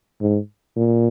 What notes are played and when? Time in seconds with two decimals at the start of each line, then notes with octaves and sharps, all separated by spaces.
0.21 G#2
0.76 A#2